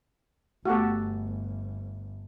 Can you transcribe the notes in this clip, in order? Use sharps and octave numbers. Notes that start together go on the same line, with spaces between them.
G1 A3 B3 F#4 G4 A4